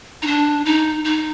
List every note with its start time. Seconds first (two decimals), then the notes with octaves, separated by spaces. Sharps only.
0.22 D#4
0.27 D4
0.66 D#4
1.04 D#4